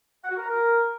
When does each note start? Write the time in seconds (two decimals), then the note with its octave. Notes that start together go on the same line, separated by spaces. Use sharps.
0.24 F#5
0.30 F#4
0.36 A#4
0.42 A#5
0.49 A#4